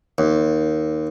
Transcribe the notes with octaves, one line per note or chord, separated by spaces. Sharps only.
D#2